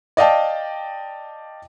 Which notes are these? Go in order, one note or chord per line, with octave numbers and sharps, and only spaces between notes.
D5 D#5 F5 G5 A5